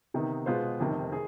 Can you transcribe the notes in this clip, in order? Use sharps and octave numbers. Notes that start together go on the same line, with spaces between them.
C3 D#3 B3 D#4
B2 G#3 B3 F4 C5
F1 F2 C3 D#3
D#3 G#4